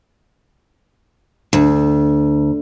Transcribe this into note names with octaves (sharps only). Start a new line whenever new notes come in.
D2